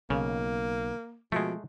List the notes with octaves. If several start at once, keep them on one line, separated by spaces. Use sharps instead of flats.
B1 C#3 A#3
B2 F3 G#3 A3